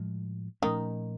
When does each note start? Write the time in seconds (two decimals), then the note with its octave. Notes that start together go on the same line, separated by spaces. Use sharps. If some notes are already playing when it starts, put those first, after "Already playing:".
Already playing: A2 F3 G#3
0.62 A#2 D#3 F3 A3 C#4 D#4